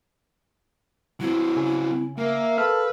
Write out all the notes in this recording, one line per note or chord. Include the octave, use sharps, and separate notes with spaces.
F#3 C4 E4
C#3 G#5
A#3 A#4 E5
A4 B4 F5 E6 F6